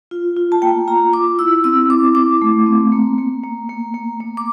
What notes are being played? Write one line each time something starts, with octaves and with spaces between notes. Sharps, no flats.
F4
F4
A5
A#3 G5
F4 A#5
F4 D6
E4 E6
C4 E6
E4 D6
E4 D6
A3
C4
A#3
A#3
A#3
A#3
A#3
A#3
D6